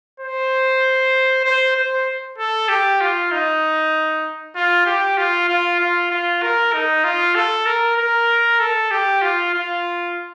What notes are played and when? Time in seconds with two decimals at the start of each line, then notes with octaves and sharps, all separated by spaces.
0.20 C5
1.44 C5
1.76 C5
2.38 A4
2.69 G4
3.01 F4
3.31 D#4
4.56 F4
4.86 G4
5.18 F4
5.49 F4
5.79 F4
6.11 F4
6.42 A#4
6.73 D#4
7.04 F4
7.35 A4
7.66 A#4
7.97 A#4
8.60 A4
8.91 G4
9.22 F4
9.54 F4